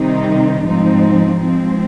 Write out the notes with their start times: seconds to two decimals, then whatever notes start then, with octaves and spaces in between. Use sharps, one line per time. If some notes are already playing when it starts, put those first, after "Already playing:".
Already playing: C3 D#3 G3 C4 D#4
0.64 G#2 F3 C4 D#4
1.41 F3 G#3 C4